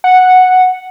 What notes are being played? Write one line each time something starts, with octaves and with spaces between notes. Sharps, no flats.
F#5